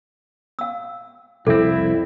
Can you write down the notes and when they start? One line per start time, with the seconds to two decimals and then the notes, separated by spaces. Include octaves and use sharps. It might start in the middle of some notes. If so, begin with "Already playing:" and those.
0.59 F5 E6
1.47 C2 F2 C4 E4 A4